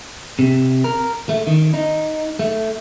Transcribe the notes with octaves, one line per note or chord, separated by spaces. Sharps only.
C3
A#4
A3
D#3
D#4
A3